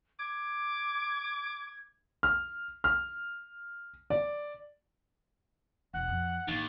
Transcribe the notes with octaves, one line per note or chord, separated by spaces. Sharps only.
D6 G#6
F6
F6
D5
E1 F#5
F2
A1 D#2 D3